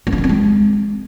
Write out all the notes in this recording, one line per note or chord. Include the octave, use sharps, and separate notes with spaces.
B3
D4
D#3
C4
G#3